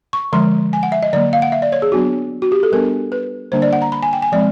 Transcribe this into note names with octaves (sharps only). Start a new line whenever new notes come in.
C#6
D3 F3 G#3 C6
G#5
F#5
E5
D#5
D3 F#3 A#3 D5
F5
F#5
E5
D5
C#5
G#4
F#3 B3 D4 F#4
F#4
G4
A4
G3 B3 D4 A#4
B4
D3 G3 A#3 D4 C5
D5
F#5
A#5
B5
G#5
G5
G#5
F3 G#3 C4 D5